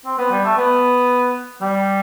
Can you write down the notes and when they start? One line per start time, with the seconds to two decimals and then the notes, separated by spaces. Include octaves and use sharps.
0.05 C4
0.18 B3
0.31 G3
0.44 A3
0.57 B3
1.61 G3